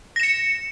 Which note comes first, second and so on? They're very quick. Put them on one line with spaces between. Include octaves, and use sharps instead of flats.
A#6 E7 C#7